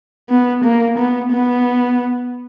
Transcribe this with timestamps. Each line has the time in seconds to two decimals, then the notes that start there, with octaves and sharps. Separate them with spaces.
0.30 B3
0.64 A#3
0.98 B3
1.32 B3